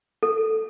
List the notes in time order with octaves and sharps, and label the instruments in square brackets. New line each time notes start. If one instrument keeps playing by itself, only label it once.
[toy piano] A4